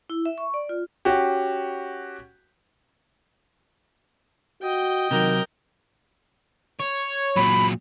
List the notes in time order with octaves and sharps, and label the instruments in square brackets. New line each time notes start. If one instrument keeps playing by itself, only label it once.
[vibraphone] E4
E5
C#6
D5
F4
[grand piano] C#4 F#4 G4
[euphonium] F#4 [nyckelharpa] D#5 G5
[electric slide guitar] C3 F#3 [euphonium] D#3 [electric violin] A#4 G6
[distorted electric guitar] C#5
[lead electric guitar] A#2 F#3 [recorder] B5